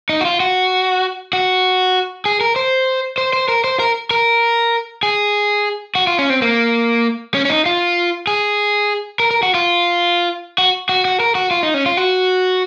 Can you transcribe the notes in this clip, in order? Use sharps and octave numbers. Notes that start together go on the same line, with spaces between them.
D#4
F#4
F4
F#4
F#4
G#4
A#4
C5
C5
C5
A#4
C5
A#4
A#4
G#4
F#4
F4
C#4
C4
A#3
C#4
C#4
D#4
F4
G#4
A#4
A#4
F#4
F4
F#4
F#4
F#4
A#4
F#4
F4
D#4
C#4
F4
F#4